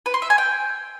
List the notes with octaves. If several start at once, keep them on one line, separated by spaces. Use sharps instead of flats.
B4
C6
E5
G#5
G5